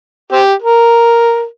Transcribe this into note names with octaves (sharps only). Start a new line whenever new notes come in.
C4 G4
A#4